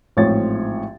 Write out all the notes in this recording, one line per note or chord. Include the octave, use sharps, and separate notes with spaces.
A1 G#2 F3 C4 C#5 A6